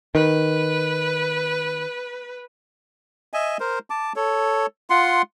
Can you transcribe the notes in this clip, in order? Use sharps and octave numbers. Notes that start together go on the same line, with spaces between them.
D#3 B4
D#5 E5 G#5
A#4 C5
A5 D6
A4 C#5
F4 F#5 C6